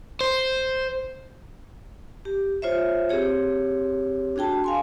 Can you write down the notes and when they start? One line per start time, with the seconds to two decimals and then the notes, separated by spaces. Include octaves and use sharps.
0.21 C5
2.25 G4
2.62 F4 C5 C#5 E5
3.09 C4 G4 G#4 C#5
4.36 D4 F#4 G#4 G5 A5
4.64 F5 G#5 C6